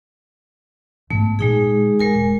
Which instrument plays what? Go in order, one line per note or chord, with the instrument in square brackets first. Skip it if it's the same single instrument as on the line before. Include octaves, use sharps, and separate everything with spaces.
[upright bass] G#2 B3 [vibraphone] A3
[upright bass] A#2 D3 [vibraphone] G#3 D#4 G#4
[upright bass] G1 [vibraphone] G#3 A#4 G#5
[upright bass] D#1 A#3